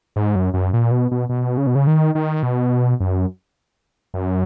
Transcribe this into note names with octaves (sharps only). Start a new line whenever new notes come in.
G#2
F#2
F#2
A#2
B2
B2
B2
C#3
B2
C#3
D#3
D#3
B2
F#2
F#2